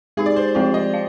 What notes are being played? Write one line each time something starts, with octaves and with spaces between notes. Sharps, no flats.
G#3 D#4 G4 G#4
D5
C5
F3 G#3 C4 F4 G4
D#5
F5